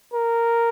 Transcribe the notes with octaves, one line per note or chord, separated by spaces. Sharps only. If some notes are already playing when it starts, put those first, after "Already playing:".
A#4